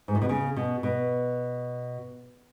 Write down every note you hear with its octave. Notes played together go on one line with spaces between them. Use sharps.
G#2
A2
B2
C#3
B2
B2